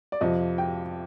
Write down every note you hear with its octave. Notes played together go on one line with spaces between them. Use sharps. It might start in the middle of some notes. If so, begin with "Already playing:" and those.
D5
F2 C3 F3 D#5
G5